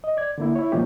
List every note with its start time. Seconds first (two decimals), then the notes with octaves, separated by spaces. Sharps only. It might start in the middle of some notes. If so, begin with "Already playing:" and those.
0.04 D#5
0.17 D5 G#6
0.38 D3 A#3 E4
0.55 E4 C#5
0.72 A#2 D#3 F3 A#3 C#4 G4